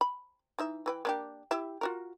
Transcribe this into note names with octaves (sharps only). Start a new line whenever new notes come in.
B5
E3 D#4 E5
E3 B4 G5
A#3 D4 G4
E4 G4 E5
F4 F#4 A#4